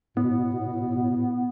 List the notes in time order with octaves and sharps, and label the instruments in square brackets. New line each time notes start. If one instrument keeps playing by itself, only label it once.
[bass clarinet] A2 [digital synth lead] B3
[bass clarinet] B2
A2
B2
A2
B2
A2
B2
A2
B2
A2
B2
A2
B2
A2